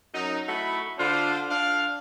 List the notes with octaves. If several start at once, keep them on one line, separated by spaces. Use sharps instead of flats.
F#2 F#3 D#4
A3 E4 F#4 B5
D3 D4 F4 C5
D4 F5